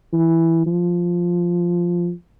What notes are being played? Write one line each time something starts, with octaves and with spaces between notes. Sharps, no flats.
E3
F3